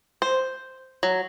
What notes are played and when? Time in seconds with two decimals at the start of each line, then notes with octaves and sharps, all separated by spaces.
0.22 C5
1.03 F#3